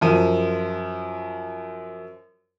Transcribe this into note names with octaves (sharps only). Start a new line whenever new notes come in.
F#2 F3 D#7